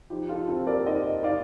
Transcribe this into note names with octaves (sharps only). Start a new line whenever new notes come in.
F3 D#4 G4
F4 A4
C4 A4 C5
A#4 D5
D#4 C5 D#5
D#4 D5 F5